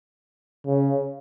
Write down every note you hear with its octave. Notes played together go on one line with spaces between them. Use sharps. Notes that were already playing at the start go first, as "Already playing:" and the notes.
C#3